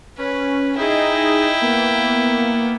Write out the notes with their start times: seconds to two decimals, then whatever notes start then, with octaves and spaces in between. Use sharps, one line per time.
0.18 C#4 B4
0.77 D#4 E4 G#4 D#5 G5
1.61 A#3 B3